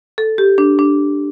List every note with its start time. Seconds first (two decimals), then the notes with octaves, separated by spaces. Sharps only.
0.18 A4
0.38 G4
0.58 D4
0.79 D4